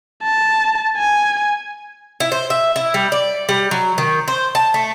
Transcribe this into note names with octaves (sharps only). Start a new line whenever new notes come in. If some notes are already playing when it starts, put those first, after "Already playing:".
A5
G#5
E4
C5
E5
E4
G3
D5
G3
F#3
D#3
C5
A5
A3